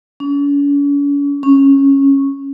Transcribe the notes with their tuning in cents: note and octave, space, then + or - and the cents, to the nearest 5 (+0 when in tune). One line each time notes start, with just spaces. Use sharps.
C#4 +45
C#4 -10